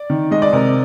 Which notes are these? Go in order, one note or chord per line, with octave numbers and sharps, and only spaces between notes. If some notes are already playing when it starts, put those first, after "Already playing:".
Already playing: D5
D#3
G#3 D#5
D5
C3 A#4